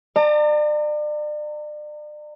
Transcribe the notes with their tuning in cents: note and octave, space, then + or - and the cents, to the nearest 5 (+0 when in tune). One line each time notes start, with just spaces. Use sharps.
D5 +35 A#5 -40